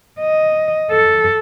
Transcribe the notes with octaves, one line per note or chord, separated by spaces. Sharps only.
D#5
A4